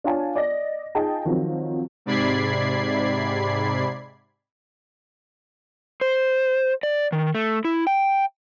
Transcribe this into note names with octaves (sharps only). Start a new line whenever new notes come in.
D4 F4 C#5 G#5 A5
D5 D#5 A#6
D#4 F4 G#4 D#5 G5 A5
D#3 F3 F#3 C4
G#2 C3 D5 B5 G#6 C7
C5
D5
D#3
A3
E4
G5